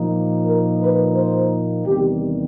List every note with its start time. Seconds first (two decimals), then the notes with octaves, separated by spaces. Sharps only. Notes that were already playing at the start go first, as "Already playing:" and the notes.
Already playing: A#2 F3 A#3 D#4
0.44 A#4
0.79 B4
1.15 C5
1.85 E2 C3 D#3 G3 G4